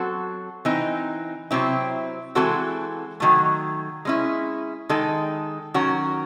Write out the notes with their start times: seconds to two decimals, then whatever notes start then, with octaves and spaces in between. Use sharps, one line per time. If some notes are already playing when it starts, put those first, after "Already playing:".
Already playing: F#3 C4 F#4 A4
0.65 E3 C4 D#4
1.51 C3 F#3 C4 E4
2.35 E3 G#3 C4 F#4 A4
3.20 D#3 F#3 A3
4.05 G#3 C#4 E4
4.89 D#3 G#3 D#4 A4
5.74 D#3 F#3 C#4 F#4